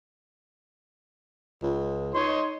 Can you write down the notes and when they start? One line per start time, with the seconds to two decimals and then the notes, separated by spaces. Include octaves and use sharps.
1.62 C#2
2.15 D#4 C#5 D#5 C6